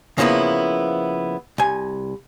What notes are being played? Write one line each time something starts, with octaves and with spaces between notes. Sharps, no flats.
C#3 F3 A#3 B3 E4
C2 G#5